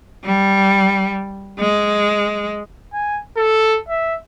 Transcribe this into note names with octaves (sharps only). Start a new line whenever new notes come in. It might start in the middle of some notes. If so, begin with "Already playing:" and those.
G3
G#3
G#5
A4
E5